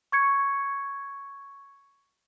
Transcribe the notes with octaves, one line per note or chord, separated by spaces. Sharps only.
C#6 G#6 C#7